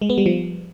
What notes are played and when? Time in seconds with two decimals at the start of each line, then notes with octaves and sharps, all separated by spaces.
0.02 G#3
0.10 B3
0.18 G3
0.26 F3